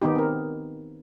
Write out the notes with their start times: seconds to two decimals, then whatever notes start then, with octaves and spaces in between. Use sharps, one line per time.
0.02 D#3 B3 D#4 G4
0.15 C4 A#4